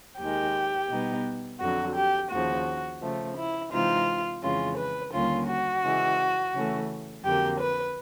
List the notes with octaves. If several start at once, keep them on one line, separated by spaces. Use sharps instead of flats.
D#2 D#3 G#3 G4
B2 G3 B3 D#4
F2 D3 F#3 F#4
G4
D#2 C#3 F3 F#4
C#3 F3 A3
E4
C3 E3 G#3 C4 D#4 F4
F2 C#3 E3 G#3 C#4 F4
B4
D#2 D3 G3 A#3 C#4 F4
F#4
C#3 E3 G#3
C#3 E3 A3 C#4
F2 D3 F#3 A#3 G4
B4